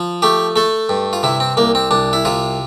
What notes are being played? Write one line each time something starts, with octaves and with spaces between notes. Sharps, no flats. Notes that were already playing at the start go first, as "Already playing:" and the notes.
Already playing: F3
A3 G4
A3 A4
G2
F4
C3 E4
C4
C2 A#3
C4
C2 D4
E4
C3 F4